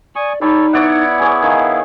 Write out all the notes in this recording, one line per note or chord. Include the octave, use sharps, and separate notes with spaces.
D5 G#5 C#6 D#6
G3 D#4 A4 C#5
B3 E4 C#5 D5 F#5
G#4 C#5 G#5
D#3 F5